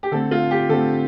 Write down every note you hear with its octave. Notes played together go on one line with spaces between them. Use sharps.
G4
D3 A3 C4 A4
F4
G4
D3 A3 C4 A4